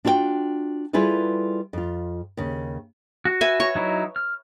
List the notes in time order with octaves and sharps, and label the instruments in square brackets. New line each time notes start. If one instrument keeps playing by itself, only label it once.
[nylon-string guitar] D4 F4 F#4 D#5 G5
G3 E4 F4 G#4 A4 B4
F2 F4
D#2 C#3
[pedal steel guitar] F#4
[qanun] B4 E5 G#5
C#5 C#6
[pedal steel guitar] F#3 D#4 E4
F6